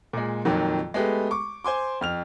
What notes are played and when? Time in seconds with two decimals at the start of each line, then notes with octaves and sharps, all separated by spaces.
0.13 A#2 G#3
0.45 F2 A#2 D#3 F#3
0.94 G#3 A3 B3 G4
1.31 C#6 D6
1.64 C5 G#5 C6 D6
2.01 F2 F6 F7